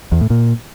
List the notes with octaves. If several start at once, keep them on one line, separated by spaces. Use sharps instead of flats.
E2
A2
A#2